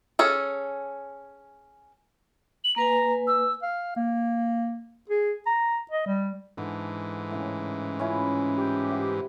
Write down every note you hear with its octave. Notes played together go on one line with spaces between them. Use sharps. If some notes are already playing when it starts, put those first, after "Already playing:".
C#4 G#4 A4
F#7
A#3 B4 G#5 A#5
E6
F5
A#3
G#4
A#5
D#5
G3
G#2 D3 E3
A2 C#3
C#4 E4 F4
G4
C5 E5 F#5